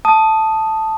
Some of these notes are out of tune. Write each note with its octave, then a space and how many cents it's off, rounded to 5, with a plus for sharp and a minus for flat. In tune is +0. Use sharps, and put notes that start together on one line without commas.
A5 +0 D#6 +0